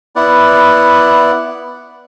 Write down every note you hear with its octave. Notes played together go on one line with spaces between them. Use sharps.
B3 E4 D5 F#5